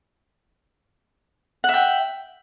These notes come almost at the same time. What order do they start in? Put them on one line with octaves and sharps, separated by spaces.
F#5 E5 G5